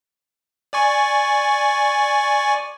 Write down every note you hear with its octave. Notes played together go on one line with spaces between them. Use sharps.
D5 G#5 C#6